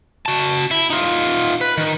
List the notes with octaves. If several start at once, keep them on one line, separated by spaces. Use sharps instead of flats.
F#4 A5
E4
D#4 F4
B4
D#3